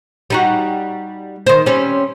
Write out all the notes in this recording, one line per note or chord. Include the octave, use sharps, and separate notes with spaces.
G3 D#4 F#4
D#3 C5
G3 C4 C#4